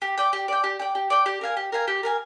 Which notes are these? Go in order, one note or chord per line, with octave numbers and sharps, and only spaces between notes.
G4
D5 G5
G4
D5 G5
G4
D5 G5
G4
D5 G5
G4
A#4 F5 G#5
G4
A#4 F5 G#5
G4
A#4 F5 G#5